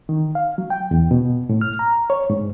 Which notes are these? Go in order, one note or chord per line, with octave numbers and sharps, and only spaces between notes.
D#3
F5
F#3
G5
E2
B2
A2
F6
A#5
C#5
G#2